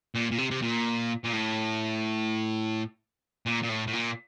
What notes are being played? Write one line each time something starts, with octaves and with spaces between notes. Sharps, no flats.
A#2
A#2
C3
C3
A#2
A#2
A2
A#2
A#2
A2
A2
A#2